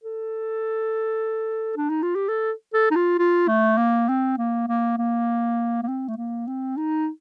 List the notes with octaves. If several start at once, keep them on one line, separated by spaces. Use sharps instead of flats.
A4
D4
D#4
F4
G4
A4
A4
D#4
F4
F4
A3
A#3
C4
A#3
A#3
A#3
A#3
C4
A3
A#3
C4
D#4